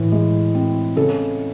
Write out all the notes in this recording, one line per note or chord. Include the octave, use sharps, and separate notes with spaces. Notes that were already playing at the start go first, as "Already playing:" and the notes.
Already playing: A2 E3
G#3
C4
C#3 A4